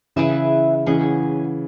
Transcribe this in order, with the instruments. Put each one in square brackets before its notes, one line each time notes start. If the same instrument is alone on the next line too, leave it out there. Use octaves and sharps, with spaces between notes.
[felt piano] C#3 E3 [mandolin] E4 G#4 B4 E5
[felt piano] C#3 E3 [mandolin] C#4 G#4 D#5 F#5